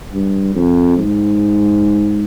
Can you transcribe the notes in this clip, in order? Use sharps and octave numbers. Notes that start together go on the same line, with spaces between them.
G2
F2
G#2